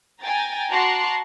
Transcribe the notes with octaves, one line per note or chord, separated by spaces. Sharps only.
G5 G#5 A#5 A6
F#4 A5 A#5 C6 D6 F#6